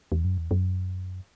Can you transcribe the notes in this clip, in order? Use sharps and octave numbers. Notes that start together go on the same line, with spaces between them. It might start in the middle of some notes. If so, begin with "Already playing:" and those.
E2
F#2
E2
F#2